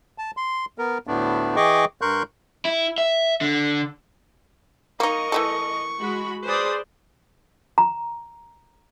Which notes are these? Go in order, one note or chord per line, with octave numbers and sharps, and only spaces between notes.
A5
C6
B3 A#4
D2 A2 A3 B3 D4
E3 G#4 D#5 G5 C#6 D6
G2 A#4 C6 C#6 F#6 G6
E4
E5
D3
A#3 D#4 A#4 D#5 C#6
E3 A3 A4
G#3 F#4 B5
G#4 B4 C5 D5 D#6
A#5